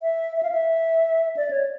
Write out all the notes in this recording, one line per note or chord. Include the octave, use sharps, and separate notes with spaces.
E5
E5
F5
E5
D5
C#5